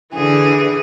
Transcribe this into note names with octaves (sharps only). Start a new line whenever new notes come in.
D3 E3 G#4